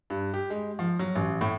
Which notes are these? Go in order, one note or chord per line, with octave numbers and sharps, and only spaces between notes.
G2
G4
G#3
F3
F#3
A1
A2